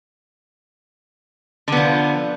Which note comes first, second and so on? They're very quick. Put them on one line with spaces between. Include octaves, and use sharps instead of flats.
D3 B3 F3